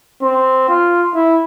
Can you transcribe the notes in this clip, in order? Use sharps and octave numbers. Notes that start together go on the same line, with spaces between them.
C4
F4
E4